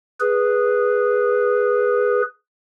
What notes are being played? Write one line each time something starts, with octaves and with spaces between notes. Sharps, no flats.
G#4 B4